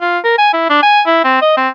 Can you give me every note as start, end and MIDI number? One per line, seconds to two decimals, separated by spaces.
0.01 0.19 65
0.24 0.36 70
0.38 0.51 80
0.53 0.65 64
0.70 0.79 62
0.83 1.01 80
1.06 1.21 64
1.24 1.42 60
1.42 1.56 75
1.57 1.69 60